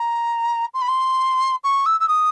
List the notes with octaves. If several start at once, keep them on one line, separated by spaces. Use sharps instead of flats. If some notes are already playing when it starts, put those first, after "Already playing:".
Already playing: A#5
C6
B5
C6
C#6
E6
E6
D#6